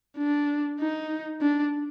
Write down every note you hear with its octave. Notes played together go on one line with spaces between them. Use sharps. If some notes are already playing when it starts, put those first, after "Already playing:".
D4
D#4
D4